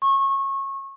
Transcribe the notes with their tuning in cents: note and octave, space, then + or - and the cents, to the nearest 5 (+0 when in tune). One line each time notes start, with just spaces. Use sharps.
C#6 -25